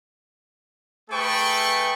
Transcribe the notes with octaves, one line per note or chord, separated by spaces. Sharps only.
A3 G#4 A4 B4 G5 C#6